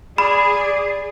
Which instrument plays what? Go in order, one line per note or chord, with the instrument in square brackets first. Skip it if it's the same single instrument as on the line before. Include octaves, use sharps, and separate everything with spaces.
[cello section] G#4 [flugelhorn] D5 [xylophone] B5